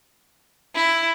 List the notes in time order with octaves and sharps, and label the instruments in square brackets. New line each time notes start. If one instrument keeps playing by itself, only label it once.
[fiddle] E4